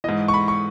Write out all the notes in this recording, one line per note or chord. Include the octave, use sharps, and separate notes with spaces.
G#2 E3 D#5
C#6
B5
C#6